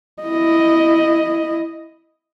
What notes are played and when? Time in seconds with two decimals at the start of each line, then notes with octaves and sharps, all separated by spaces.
0.23 E4 D#5